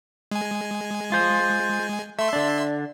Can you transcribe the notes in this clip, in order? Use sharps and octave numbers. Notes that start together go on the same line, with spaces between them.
G#3 G#5
F4 C5
A3 E5 C6
D3 D4